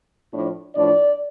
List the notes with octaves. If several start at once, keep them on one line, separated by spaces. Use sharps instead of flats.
A2 F3 D4
A2 F3 D4 D5